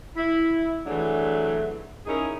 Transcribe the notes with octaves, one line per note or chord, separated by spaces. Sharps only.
E4
E3 F#3 A3 D4 G#4
C#4 D#4 E4 G#4 A#4